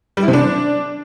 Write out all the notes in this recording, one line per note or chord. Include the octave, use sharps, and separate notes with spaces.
G3
E4
C3
D4